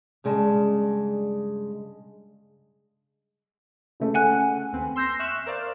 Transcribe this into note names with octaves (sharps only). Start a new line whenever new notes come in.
G2 C#3 G#3 D5 A5
C#3 A3
F#5 G#5 F#6
D#2 C4 B4
C6 E6 G6 A#6 C7
E5 C#6 F6 F#6 E7
A#4 C5 D5 F5